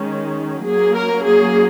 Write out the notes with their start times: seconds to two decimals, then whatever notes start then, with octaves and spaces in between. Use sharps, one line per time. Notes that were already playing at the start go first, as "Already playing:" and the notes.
Already playing: D#3 G#3 C#4
0.65 F#3 A#3 C#4 G#4
0.95 A#4
1.24 G#4